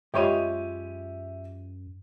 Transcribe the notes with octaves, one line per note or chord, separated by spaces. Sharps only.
F#2 G#3 F4 G4 C#5 D#5 E5 D#7